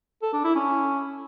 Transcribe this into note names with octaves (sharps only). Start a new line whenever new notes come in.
A4
D4
E4
C#4